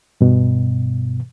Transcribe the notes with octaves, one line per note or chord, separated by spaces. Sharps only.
G2 B2